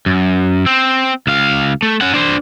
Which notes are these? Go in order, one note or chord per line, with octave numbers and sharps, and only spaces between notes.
F#2
C4
C#2 F5
A3
C#4 F#5
D4 C5